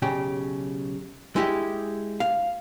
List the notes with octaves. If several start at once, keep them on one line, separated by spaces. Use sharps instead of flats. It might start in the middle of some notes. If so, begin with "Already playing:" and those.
B1 C#3 G4
G#3 E4 G4
F5